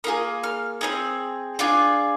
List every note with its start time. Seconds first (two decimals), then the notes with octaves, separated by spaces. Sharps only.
0.04 A#3 F4 G#4 D#6
0.44 F6
0.81 C4 D#4 G#4 D#6
1.59 D4 F4 G#4